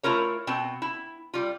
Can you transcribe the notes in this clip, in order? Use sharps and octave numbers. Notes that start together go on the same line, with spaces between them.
A3 E4 F4 A#4 C#5
B2 C4
E4
G3 F4